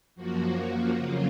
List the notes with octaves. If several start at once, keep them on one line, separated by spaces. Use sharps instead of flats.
F#2 F3 A#3 F#4
F2 C#3 F#3 A#3 F4